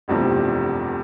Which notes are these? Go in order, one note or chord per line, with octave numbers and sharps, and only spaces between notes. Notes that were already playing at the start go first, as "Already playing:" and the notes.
F1 B1 E2 G2 C3 F3